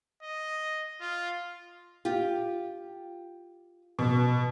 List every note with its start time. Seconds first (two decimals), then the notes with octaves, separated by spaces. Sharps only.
0.23 D#5
1.01 F4
2.05 F4 G4
3.99 B2